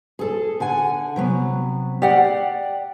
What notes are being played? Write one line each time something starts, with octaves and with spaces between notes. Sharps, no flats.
G#4 A4
D3 F#5 G#5
C3 F#3 B3
G4 D5 F5 F#5